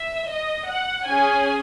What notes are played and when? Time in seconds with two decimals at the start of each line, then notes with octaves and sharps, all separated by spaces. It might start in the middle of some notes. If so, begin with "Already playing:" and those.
Already playing: E5
0.28 D#5
0.68 F#5
1.07 C#4 G#4 G#5